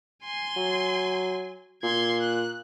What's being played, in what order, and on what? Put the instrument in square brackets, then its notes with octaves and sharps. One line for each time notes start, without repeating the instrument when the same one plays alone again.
[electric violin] G#5 C6
[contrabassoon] F#3
[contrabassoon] A#2 [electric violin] C6 G#6
[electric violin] F#6